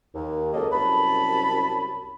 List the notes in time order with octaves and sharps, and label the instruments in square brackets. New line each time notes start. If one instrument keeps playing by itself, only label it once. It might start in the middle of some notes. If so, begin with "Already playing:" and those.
[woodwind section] D#2
C#2 F#3 A#3 A4 D#5
C2 F#2 A5 B5